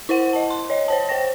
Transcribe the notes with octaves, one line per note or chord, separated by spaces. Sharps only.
E4 C5 F#5
D#5 A5
C6
C#5 D#5
C5 C#5 A5
C5 G5 A#6